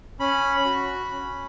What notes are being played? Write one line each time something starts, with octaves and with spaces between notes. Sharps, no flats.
C#4 B5
F#4
C#4